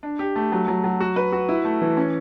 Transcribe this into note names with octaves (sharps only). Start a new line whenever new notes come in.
D4
G4
A3
F#3
F#3
F#3
F#4
B4
F#4
E4
A3
E3
C#4